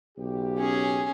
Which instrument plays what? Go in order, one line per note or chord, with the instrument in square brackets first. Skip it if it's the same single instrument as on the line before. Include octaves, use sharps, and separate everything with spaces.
[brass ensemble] B1 C#3 G4
[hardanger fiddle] C#4 G#4